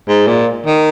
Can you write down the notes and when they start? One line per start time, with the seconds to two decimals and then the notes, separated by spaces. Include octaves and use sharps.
0.08 G#2
0.27 A#2
0.66 D#3